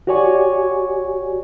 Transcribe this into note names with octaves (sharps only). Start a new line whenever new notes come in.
F#4 G4 C#5 D5 G#5 C#6